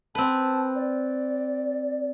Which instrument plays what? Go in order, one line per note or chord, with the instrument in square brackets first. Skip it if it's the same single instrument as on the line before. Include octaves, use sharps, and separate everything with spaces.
[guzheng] C4 B4 [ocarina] A5
[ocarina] D5